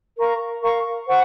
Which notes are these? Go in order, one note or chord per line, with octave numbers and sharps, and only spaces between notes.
A#4 F5 A#5 C#6
A#4 F5 A#5 C#6
C5 F#5 C#6